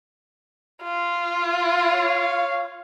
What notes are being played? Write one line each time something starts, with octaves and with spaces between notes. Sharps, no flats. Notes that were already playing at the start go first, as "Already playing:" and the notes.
F4
C#5 F5